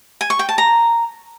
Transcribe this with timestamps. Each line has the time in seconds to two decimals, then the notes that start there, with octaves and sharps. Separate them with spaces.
0.21 G#5
0.30 C#6
0.39 G5
0.49 A5
0.58 A#5